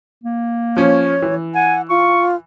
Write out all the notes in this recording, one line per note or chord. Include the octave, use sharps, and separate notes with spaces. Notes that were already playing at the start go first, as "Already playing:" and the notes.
A#3
F3 C#4 C#5
E3
F#5 G#5
F4 C#6